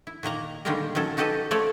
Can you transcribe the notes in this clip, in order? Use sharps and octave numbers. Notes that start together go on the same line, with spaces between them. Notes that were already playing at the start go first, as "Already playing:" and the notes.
E4
A#2 D#3 A#3 A#5
D3 D#3 G3 G#3 A#3 A#4
D#3 F#3 C#4 A4
D#4 F#4 G4 A4 B4 D#5
F3 A3 A4 C#5 D5